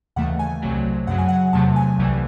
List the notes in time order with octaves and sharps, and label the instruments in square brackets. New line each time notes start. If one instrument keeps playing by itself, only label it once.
[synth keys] D#2 C#3 E3 A3 F#5
G#5
C2 C3 F#3 A3
F#2 C#3 F#3 F#5
G#5
F#5
E2 C3 F#3 A3 A5
G#5
C2 C3 E3 A3